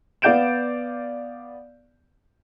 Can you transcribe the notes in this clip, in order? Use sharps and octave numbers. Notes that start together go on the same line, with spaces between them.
B3 D5 F5 G6 D7 E7